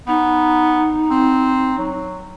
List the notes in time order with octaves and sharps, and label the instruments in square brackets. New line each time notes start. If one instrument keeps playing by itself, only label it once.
[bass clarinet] B3 [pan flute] D#4
[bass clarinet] C4
F#3